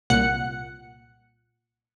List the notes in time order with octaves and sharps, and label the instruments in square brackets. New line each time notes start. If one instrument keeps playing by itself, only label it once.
[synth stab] C2 A#2 F#5 F#6 C#7